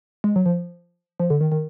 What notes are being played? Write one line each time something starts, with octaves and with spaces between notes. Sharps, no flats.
G#3
F#3
F3
F3
D3
D#3
D#3